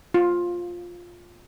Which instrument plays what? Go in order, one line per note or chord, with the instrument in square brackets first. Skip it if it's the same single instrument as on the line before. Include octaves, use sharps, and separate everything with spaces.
[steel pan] F4